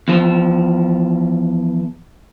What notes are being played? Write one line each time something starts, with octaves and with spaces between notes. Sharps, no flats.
E2 F3